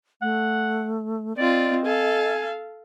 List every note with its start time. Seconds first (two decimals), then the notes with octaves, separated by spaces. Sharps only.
0.22 A3 F#5
1.38 C4 F4 D5 D#5
1.85 A4 F5 G#5